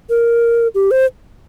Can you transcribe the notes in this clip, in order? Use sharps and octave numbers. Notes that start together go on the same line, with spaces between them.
A#4
G4
C5